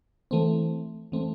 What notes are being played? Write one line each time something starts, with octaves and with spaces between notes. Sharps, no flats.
E3 A3 C4
E3 A3 C4